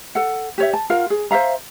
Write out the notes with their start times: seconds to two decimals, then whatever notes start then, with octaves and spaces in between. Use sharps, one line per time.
0.15 A4 F#5
0.58 G4 C#5 E5
0.73 A5
0.90 F4 A#4 F5 F#5
1.10 G#4
1.31 C5 E5 F5 A#5